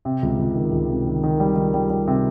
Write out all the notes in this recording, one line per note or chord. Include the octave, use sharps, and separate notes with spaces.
C3
C#2
C#2
D#3
C#2
C3
D#3
D#3
G3
D#3
G3
G3
C3